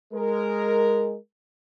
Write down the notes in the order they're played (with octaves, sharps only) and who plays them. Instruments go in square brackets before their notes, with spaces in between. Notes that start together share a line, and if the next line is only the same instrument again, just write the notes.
[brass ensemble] G#3 A#4